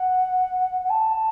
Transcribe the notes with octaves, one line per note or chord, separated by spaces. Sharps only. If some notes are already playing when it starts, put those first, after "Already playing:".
Already playing: F#5
F#5
A5